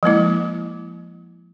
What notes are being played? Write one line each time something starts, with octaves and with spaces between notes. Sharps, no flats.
F3 G#3 A#3 E4